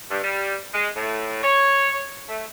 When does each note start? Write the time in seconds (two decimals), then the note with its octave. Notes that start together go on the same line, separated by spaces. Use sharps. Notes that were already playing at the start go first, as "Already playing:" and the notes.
0.11 G2
0.23 G3
0.74 G#3
0.96 A2
1.43 C#5
2.29 A3